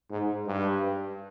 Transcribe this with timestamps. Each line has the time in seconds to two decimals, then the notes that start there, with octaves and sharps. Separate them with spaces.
0.11 G#2
0.46 G2